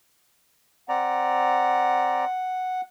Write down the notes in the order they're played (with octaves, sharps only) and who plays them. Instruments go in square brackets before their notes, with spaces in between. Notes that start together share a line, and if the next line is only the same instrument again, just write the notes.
[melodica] C4 D5 A#5 [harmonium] F#5